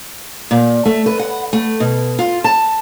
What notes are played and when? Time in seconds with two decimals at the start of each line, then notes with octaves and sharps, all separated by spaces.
0.51 A#2
0.85 A3
1.06 B4
1.19 F#5
1.53 A3
1.80 B2
2.19 F4
2.44 A5